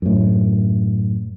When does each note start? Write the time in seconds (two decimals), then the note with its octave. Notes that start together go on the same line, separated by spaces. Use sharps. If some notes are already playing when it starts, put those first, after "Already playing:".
0.02 F#2 A2